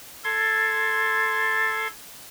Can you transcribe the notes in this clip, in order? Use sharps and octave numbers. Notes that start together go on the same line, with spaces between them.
A4 C6 G#6 A6